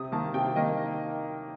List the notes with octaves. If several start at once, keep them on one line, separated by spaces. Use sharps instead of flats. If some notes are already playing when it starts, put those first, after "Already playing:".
Already playing: C3 D#6
D#3 A#3 A5
C3 G5
D#3 A#3 D#5